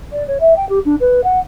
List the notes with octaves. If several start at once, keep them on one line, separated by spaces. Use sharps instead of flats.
D5
C#5
E5
G5
G4
D4
B4
F#5